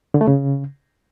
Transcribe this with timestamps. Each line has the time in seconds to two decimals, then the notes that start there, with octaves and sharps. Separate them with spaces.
0.14 D3
0.21 A3
0.28 C#3